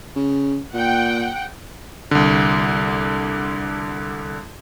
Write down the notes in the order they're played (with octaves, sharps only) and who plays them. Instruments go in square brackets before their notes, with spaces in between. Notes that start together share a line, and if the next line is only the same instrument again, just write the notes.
[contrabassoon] C#3
[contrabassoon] A#2 [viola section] F#5 G5
[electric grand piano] C2 D3